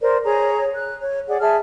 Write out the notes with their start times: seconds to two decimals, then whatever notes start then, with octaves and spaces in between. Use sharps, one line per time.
0.01 A#4 C5 D5
0.24 G#4 C#5 A#5
0.75 F#6
1.00 C#5
1.28 G#4 D5 F#5
1.40 G#4 E5 A5 F6